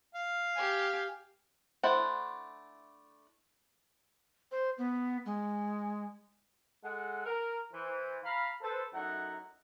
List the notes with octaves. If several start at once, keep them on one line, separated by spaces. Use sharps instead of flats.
F5
G4 G#5
A3 D4 E4 C5 F#5
C5
B3
G#3
G#3 A4 F#5
A#4
E3 C5
F5 A#5 B5
A4 B4 C5
F#2 A3 D#4 E4 F#5 A#5